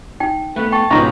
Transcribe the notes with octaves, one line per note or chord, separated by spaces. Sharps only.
D#4 G5
A3 B3 B4
G5 A5 C#6
C#2 G#2 B2 D#4 F4 B4 A#5 C#6